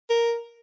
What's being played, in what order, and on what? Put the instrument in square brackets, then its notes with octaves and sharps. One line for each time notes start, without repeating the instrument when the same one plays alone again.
[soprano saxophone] A#4